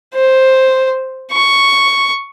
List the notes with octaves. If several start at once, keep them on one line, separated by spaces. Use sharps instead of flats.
C5
C#6